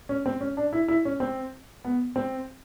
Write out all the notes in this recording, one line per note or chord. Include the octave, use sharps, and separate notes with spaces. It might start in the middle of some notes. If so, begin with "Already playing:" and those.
C#4
C4
C#4
D4
E4
E4
C#4
C4
B3
C4